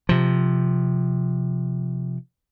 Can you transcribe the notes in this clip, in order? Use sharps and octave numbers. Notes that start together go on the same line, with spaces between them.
C3 F3